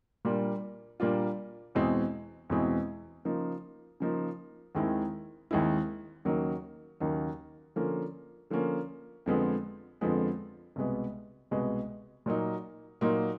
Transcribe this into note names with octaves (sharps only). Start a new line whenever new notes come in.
A#2 G3 A#3 D4 F4
A#2 G3 A#3 D4 F4
E2 B2 G#3 C4 E4
E2 B2 G#3 C4 E4
C#3 F3 A#3 D#4
C#3 F3 A#3 D#4
D#2 D#3 G#3 C4 E4
D#2 D#3 G#3 C4 E4
D#2 C#3 F#3 A#3 D#4
D#2 C#3 F#3 A#3 D#4
D3 F3 A#3 C#4
D3 F3 A#3 C#4
F2 D3 F3 G#3 B3
F2 D3 F3 G#3 B3
C2 B2 G#3 B3
C2 B2 G#3 B3
A#2 F#3 A#3 D#4
A#2 F#3 A#3 D#4